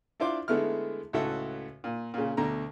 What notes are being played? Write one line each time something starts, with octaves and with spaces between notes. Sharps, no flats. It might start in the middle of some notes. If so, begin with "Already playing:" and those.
D4 E4 F4 C5 D6
D3 G#3 A3 B3 E4 F6
C#2 A2 F#4 A4 E5
A#2
A#2 C#3
D2 B2 D3 A#5